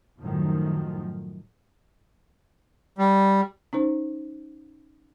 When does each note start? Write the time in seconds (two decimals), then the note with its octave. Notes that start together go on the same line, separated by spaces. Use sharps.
0.21 F#2 A2 D#3 F3
2.98 G3
3.73 C#4 D#4 C5